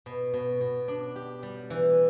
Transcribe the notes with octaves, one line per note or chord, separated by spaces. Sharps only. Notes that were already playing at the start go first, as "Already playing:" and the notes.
B2
B2
B2
D4
G4
G3
E3